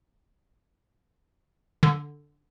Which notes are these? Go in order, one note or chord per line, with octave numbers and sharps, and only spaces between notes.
D3